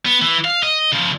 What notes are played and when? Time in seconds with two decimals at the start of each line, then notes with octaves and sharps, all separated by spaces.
0.05 B3
0.22 E3
0.45 F5
0.63 D#5
0.92 C#3 F3